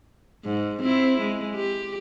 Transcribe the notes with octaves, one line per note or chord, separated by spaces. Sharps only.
G#2
C4 E4
G#3
G4